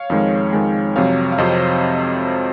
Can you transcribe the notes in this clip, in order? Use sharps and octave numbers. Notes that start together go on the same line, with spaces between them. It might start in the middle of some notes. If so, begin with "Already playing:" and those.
Already playing: C#5 F5
F2 D#3 G#3
F2 D#3 G#3
F2 C3 F#3 C#5 F5
F5
F2 C3 F#3 C5 D#5